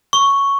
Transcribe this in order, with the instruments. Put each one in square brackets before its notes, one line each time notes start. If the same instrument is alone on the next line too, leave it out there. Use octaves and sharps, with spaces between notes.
[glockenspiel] C#6